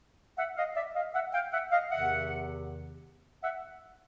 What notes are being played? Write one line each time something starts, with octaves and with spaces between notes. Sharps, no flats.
E5 F#5
D#5 F5
D5 E5
D#5 F5
E5 F#5
F5 G5
E5 F#5
D#5 F5
E2 C3 D#3 E5 F#5
E5 F#5